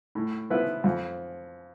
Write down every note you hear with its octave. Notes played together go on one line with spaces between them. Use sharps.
A2
F3 B3 E4 B4
F2